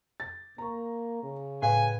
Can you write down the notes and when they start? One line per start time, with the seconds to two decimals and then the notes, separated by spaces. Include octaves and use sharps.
0.20 A6
0.58 A#3 A#5 C#6
1.23 C#3
1.62 A2 B4 F5 G5 G#5